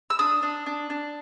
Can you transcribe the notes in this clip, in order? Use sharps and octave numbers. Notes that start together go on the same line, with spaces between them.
E6
D4 D#6
D4
D4
D4